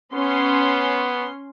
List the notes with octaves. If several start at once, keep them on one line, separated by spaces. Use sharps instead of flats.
B3 C#4 C6